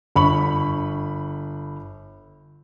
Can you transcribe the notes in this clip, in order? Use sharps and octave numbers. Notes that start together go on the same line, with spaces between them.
G1 B5 C#6 F#7